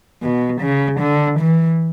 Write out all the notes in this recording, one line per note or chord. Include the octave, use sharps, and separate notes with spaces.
B2
C#3
D3
E3